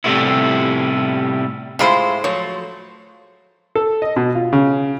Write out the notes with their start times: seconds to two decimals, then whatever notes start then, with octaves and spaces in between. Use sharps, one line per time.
0.04 A2 C3 G3 A3 B3 E4
1.79 A2 G#3 E4 F4 C5 B5
2.24 F3 F#3 A3 C#5
3.75 A4
4.02 D#5
4.16 B2
4.35 F4
4.53 C#3